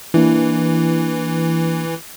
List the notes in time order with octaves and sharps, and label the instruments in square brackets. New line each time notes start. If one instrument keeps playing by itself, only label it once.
[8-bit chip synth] E3 [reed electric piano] A#3 D4 E4